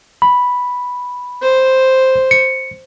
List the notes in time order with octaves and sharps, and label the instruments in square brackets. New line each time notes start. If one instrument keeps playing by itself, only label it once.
[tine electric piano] B5
[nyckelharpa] C5
[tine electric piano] C#7